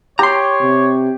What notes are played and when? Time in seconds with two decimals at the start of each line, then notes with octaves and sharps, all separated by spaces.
0.19 G4 C#5 A#5 C6
0.61 C3